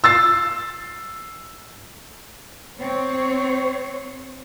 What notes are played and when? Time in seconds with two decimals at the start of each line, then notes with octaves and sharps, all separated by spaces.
0.04 E6 A6 C7
2.80 C4 C5 C#5